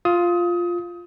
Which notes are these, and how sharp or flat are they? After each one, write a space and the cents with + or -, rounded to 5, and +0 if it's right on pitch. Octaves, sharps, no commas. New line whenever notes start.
F4 +0 D#6 +25